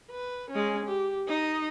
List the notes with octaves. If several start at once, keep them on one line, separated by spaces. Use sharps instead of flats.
B4
G#3 C#4
G4
D#4 D#5